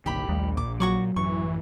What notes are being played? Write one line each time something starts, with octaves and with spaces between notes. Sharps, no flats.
G1 C2 A#2 D#3 G4 B5
A#1 D#2 G3 A3
A#2 D6
F#3 F#4 C#6 D6
A1 F#2 E3 C#6